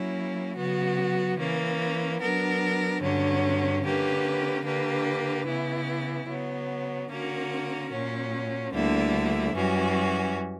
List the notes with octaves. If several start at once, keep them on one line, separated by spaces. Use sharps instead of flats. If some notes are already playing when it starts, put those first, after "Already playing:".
Already playing: F#3 A#3 C#4 E4
C#3 F#3 B3 F#4
E3 A#3 C#4
F#3 B3 D4 A#4
G2 D3 F#3 C#4
D3 A#3 C#4 G4 B4
D3 A#3 D4 G4 B4
C#3 E3 B3 E4
C#3 F#3 B3
D3 A#3 C#4 F#4 A#4
A#2 F#3 C#4
D2 D3 G3 A#3 E4
F#2 E3 G3 C#4 F#4